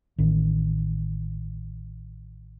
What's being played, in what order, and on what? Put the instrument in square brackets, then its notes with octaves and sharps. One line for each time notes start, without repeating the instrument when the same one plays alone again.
[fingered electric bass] A1 D#3